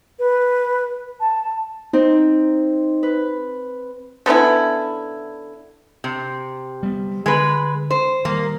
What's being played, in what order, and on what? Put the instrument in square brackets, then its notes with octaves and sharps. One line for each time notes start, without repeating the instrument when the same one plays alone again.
[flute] B4
A5
[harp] C4 [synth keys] D#4
[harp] B4
[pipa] D3 B3 C#4 E4
[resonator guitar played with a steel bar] C3
[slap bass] G3 B3
[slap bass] D3 [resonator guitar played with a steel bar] G#3 B4
[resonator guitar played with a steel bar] C5
[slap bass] D#3 G3 [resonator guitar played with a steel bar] A#3